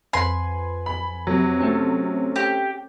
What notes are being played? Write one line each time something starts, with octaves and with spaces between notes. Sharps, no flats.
F2 B4 G#5 C6
B5
C3 F#3
A3 C4 C#4
G4